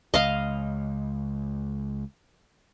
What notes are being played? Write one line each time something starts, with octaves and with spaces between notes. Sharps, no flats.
C#2 D#5 F5